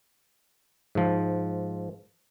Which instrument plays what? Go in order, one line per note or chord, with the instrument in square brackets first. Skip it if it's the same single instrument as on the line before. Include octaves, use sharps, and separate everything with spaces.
[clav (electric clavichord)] G#2 F3